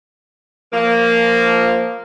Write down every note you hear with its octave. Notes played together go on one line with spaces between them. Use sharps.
F3 A#3